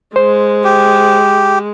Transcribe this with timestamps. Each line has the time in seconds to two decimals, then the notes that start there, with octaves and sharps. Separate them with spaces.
0.16 G#3 C5
0.64 G4